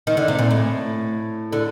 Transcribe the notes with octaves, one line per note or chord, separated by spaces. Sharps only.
D#3
D3
C3
A#2
A2
D3